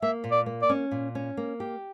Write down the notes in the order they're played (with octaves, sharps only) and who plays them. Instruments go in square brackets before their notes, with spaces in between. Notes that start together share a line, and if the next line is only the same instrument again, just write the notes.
[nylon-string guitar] A#3 [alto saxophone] E5
[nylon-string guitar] A#2
[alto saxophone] D5
[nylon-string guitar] A#3
[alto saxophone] D5
[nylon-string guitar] C#4
A#2
C#4
A#3
G4